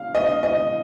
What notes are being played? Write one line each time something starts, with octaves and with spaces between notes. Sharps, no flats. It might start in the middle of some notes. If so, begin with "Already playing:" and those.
Already playing: F5
D#5
D#5